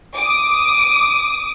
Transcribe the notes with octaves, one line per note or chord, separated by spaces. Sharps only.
D6 D#6